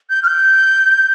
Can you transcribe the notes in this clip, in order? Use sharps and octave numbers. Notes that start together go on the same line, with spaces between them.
G6
F6
G6